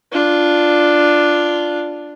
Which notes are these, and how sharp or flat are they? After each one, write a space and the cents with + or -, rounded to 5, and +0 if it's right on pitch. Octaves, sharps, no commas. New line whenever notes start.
D4 +0 F4 -5